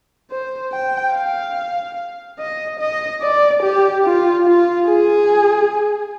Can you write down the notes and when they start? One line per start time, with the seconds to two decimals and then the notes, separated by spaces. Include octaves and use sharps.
0.31 C5
0.73 G5
1.14 F5
2.39 D#5
2.80 D#5
3.22 D5
3.63 G4
4.05 F4
4.46 F4
4.87 G#4